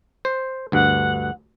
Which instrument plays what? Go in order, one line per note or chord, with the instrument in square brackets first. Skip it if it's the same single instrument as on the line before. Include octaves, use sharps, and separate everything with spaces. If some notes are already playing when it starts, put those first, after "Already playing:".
[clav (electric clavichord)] C5
[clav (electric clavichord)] D2 G2 [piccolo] F#5